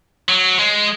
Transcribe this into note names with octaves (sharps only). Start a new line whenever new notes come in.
F#3
G#3